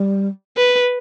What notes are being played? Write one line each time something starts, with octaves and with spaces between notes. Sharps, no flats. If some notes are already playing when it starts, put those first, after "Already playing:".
Already playing: G3
B4